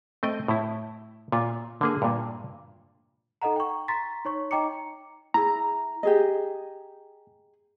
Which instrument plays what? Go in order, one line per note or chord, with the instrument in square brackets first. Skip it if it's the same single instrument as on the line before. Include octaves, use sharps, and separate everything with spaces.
[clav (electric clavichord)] A3 C4 D#5 G5
A2 E4
A#2 F4
D3 A#3 G#4
G2 A#2
[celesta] D#4 A4 D#5 F#5 A#5
G5 C#6
A#5 C6 A6 B6
D#4 C#5 C#6
D#4 D#5 G5 A#5 D6 C#7
[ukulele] E4 G#4 [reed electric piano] A#5
[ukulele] G4 G#4 D#5